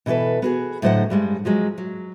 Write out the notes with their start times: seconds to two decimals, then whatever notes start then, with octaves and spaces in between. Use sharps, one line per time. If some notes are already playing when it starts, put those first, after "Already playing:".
0.06 B2 E3 G#4 A4 B4
0.42 B3 F#4 G#4
0.82 A2 D3 F#3 C5 D#5 F#5
1.10 G2 G3 G#3
1.45 F3 F#3 G#3
1.78 F#3